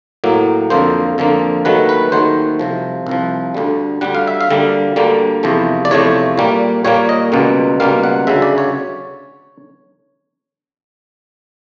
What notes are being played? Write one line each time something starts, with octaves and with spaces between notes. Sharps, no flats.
A2 F#3 A#3
F2 D3 F3 A#3 C5
F2 D3 F3 A#3
D#2 D#3 F#3 A3 B4
B4
D#2 D#3 F#3 A3 C5
C2 C3 F3
C2 C3 F3
D2 D3 G3
D2 D3 G3 F#5
F5
E5
F5
D2 D3 G3 A#3
D2 D3 G3 A#3
E2 C3 F3 A3
D5
E2 C3 F3 A3 C#5
A#2 G3 A#3
A#2 G3 A#3 C#5
D#5
C#2 B2 G3 A#3
C#2 B2 G3 A#3 F5
F#5
D2 C#3 F#3 E5
D5
C#5